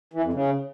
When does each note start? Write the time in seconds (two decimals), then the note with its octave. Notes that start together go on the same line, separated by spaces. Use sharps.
0.14 E3
0.23 F2
0.33 C#3